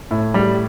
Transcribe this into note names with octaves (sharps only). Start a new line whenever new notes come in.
A2
G3